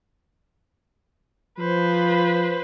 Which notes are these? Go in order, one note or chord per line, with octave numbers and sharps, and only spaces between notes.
F3 B4 C5